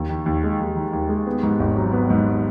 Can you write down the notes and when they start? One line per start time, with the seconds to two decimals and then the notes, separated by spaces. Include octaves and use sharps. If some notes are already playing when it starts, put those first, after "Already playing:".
Already playing: D#2
0.09 D#3
0.26 D#2
0.44 G#3
0.60 D#2
0.76 D#3
0.93 D#2
1.09 G#3
1.27 B3
1.43 G#2
1.60 G#1
1.76 F#3
1.93 B3
2.10 G#2